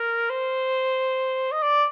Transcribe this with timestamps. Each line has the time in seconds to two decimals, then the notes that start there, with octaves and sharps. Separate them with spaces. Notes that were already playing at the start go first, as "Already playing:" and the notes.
Already playing: A#4
0.30 C5
1.52 D#5
1.62 D5